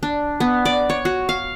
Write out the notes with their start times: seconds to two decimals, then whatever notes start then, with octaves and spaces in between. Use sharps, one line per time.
0.03 D4
0.40 B3
0.65 D5
0.90 C#5
1.05 F#4
1.29 F5